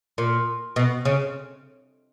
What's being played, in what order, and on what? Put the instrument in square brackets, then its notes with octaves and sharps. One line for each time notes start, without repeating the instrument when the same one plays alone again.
[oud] A#2
B2
C#3